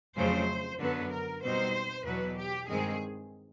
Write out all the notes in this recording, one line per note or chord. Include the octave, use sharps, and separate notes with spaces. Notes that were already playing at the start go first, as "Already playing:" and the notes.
F2 C#3 F#3 A3 C5
F#2 D3 F#3 B3 B4
A#4
B2 G3 C4 D#4 C5
E2 B2 F#3 B4
G4
G2 D#3 G#3 C4 G#4